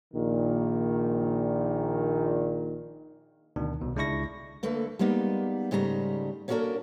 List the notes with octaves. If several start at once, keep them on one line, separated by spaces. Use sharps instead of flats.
A#1 A#2 D#3
D2 B2 D#3 D4
C2 B2
C#2 G#3 D4 E4 C#6 A#6
D3 A3 A#3 A4 B4
G3 G#3 A#3 B3 D#4
G#2 C#3 G3 A3 G#4 A#5
A#3 C#4 D4 F#4 A4 A#4